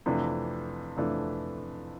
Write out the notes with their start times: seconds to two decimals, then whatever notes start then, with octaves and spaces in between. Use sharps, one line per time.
0.06 F2 C3 E3 A3 D4
0.97 F2 C3 E3 A3 D4